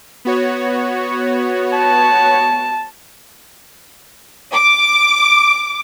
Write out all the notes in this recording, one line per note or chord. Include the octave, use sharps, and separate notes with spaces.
B3 F#4 C#5
A5
D6